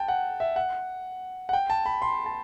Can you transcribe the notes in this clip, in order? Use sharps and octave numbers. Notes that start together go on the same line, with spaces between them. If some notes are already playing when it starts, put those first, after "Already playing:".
Already playing: G5 A5
F#5
E5
F#5
F#5
G5
A5
B5
C6
A5